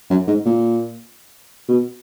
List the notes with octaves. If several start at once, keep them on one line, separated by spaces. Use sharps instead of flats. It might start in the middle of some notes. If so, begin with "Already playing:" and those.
F#2
G#2
A#2
B2